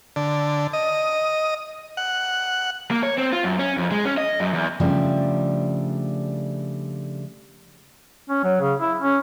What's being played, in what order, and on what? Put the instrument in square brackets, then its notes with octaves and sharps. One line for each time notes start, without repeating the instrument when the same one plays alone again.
[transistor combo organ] D3
D#5
F#5
[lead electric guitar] A#3
C#5
C4
F4
F#2
C#4
F2
G#3
C#4
D#5
F#2
E2
[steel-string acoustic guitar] C#3 F3 G3 A3 D4
[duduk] C#4
F#3
C#3
E4
C#4